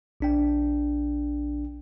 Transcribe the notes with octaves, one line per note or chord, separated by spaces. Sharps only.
A#1 D4 G5